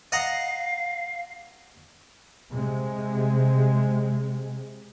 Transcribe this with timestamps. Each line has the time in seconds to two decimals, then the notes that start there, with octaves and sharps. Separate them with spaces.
0.12 D#5 F5 F#5 A#5
2.50 C3 G#3